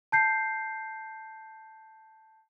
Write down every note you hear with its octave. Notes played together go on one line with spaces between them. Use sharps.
A5 G6 C7